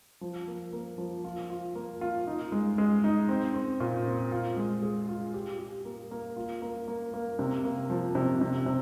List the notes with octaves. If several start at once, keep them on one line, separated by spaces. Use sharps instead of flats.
F3
A#3
A#3
F3
F4
F4
A#3
F4
D#4
G#3
G#3
D#4
C4
C4
A#2
C4
F4
G#3
G#4
F4
G4
G4
A#3
A#3
F4
A#3
A#3
A#3
C3
A#3
F3
C3
C3
C3